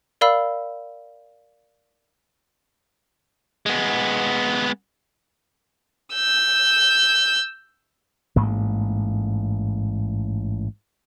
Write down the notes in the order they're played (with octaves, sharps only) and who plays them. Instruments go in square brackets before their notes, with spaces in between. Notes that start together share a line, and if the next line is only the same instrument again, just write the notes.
[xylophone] A#4 D5 F5 B5 E6
[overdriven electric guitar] G#3 B3
[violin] E6 G6
[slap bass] A1 G#2 A#3